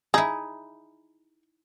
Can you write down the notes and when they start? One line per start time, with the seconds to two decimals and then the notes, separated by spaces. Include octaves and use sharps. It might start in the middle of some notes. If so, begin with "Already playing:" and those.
0.14 D#4 E4 G#4